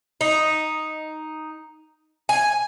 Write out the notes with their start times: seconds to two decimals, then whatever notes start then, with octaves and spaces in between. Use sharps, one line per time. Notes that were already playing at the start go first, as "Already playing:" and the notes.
0.21 D#4
2.29 G#5